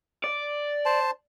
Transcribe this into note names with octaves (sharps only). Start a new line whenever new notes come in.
D5
C5 A5